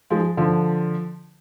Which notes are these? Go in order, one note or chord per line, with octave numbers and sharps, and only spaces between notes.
F3 G#3
D3 F3